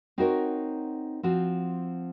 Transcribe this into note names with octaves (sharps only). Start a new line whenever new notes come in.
C4 D#4 F#4 A#4 C#5
F3 C4 F#4